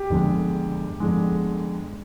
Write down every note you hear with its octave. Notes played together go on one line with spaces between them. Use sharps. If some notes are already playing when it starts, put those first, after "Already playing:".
Already playing: G4
G1 F2 D3 G#3
G1 F2 D3 G#3